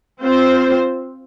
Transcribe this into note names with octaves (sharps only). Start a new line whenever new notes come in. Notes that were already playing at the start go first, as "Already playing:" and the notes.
C4 F4 C5